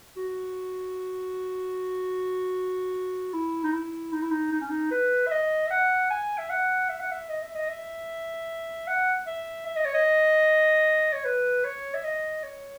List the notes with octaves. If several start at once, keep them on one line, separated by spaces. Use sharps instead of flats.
F#4
E4
D#4
E4
D#4
E4
D#4
D#4
C#4
D#4
B4
E5
D#5
E5
F#5
G#5
E5
F#5
E5
F#5
E5
D#5
E5
D#5
E5
F#5
E5
E5
D#5
C#5
D#5
C#5
B4
C#5
E5
D#5
C#5